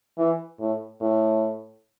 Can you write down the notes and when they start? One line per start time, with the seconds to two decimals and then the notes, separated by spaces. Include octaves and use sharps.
0.18 E3
0.59 A2
1.01 A2